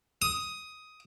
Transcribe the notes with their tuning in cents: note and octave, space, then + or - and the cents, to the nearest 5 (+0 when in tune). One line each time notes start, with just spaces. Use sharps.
D#6 +10